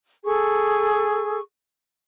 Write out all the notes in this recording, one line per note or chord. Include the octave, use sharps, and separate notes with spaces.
G#4 A4 C#6